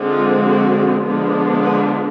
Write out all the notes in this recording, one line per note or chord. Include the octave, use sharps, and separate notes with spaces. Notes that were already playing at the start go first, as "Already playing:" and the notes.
Already playing: D3 F3 G#3 C4
F4
F#4
D3 F3 G#3 B3 D4
B4